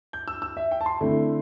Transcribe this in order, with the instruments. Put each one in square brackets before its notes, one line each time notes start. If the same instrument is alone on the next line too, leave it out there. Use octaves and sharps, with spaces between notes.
[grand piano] G6
E6
E6
E5
G5
A5
C6
D3 A3 C4 E4